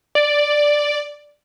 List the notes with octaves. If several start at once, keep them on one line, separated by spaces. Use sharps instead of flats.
D5